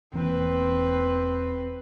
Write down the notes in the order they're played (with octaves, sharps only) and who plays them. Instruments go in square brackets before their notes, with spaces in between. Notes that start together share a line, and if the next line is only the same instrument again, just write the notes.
[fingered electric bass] E1 E3 A#3 [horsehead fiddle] C4 B4